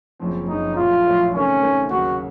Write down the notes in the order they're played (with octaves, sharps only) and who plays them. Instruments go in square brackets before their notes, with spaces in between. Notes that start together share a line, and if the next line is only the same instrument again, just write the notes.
[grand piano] F#1 F#2 F3 C4
[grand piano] F#1 F#2 F3 C4 [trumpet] D#4
[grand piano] A#1 A2 F#3 [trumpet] F4
[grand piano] A#1 A2 F#3
[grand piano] C3 D#3 A3 C4 [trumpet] C#4
[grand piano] C3 D#3 A3 C4
[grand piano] D#2 C#3 F#3 A#3 [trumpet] F#4